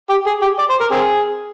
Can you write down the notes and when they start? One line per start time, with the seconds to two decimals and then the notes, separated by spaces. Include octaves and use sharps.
0.09 G4
0.26 G#4
0.42 G4
0.59 D5
0.70 C5
0.80 A#4
0.91 C4 G#4